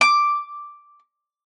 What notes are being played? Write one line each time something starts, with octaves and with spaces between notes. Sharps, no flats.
D6